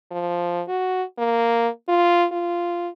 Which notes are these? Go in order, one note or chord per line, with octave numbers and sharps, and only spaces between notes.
F3
F#4
A#3
F4
F4